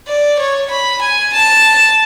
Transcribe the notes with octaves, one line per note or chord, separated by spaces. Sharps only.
D5
C#5
B5
G#5
A5